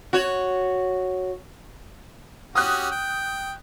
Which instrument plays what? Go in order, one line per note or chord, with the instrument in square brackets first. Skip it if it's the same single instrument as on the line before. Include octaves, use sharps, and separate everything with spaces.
[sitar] F#4 C#5
[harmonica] C#4 F#4 G4 [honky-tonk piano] D#6 F#6
[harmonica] G5